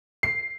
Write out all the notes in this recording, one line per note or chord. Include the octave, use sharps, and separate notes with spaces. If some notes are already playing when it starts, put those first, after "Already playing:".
C7